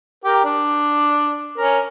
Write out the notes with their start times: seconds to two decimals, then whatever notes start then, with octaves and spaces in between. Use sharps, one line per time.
0.24 G4 A#4
0.45 D4
1.58 C#4 A#4